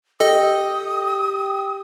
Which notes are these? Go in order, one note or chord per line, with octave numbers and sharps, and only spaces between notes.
G4 A4 D#5 D#6